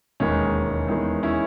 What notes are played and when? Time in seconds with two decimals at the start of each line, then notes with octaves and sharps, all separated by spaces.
0.20 E1 D#2 D#3 G#3 C#4
0.88 E2 D#3 G#3
1.23 C#4 E4